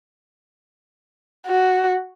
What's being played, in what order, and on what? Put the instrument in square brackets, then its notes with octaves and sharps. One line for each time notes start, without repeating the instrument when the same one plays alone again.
[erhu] F#4